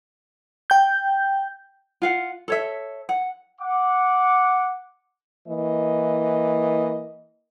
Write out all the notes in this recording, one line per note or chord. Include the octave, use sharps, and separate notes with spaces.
G5 G6
F4 F5 F#5
A4 C#5 E5
F#5
F#5 D6
E3 A#3 D#5